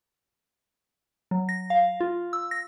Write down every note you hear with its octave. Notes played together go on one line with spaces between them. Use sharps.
F#3
A#6
F5
F4
E6
A#6